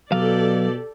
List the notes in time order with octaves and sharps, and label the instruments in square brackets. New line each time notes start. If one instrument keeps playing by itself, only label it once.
[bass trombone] B2 [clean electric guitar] F#3 F5 [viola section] G4 A4 D5